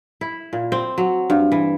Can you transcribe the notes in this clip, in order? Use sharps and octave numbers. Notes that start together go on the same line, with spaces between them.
E4
A#2
C4
F#3
G2
E3